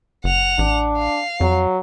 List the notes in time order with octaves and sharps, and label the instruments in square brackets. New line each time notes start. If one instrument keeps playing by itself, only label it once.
[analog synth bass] F#1 [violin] F#5 F7
[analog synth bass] A1 [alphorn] D4
[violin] F5
[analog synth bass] F2 [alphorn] F#3